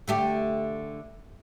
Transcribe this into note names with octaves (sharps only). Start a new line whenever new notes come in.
D3 A3 G4